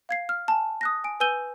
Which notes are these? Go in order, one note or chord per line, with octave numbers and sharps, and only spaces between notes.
F5 G#6 C7
F6
G#5 A5
D#6 F#6 A#6
G#5 D7
B4 G#5 E6 G6 D#7 G7